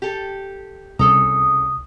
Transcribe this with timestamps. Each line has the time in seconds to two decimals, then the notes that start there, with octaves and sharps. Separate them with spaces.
0.02 G4 A4
0.99 C2 C#3 A4 A#5 D#6